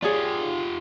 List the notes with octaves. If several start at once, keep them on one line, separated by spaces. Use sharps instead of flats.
F4 G4 G#4 C#5 D5